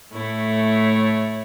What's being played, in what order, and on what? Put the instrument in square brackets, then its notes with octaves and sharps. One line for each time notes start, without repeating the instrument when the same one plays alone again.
[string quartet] A2 A3 E4 C#5